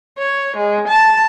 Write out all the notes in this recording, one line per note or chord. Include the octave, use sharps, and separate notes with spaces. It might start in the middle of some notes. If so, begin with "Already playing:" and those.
C#5
G#3
A5